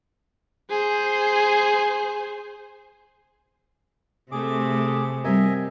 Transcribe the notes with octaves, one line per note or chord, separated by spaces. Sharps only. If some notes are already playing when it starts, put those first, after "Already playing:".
G#4 C5
C3 A3 G#4 D6
G3 C4 A#4 D#5 E5 G#5